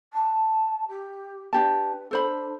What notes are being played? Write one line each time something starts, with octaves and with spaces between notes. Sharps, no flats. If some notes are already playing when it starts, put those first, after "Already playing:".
A5
G4
D4 G4 B4 A5
D4 A4 C5 B5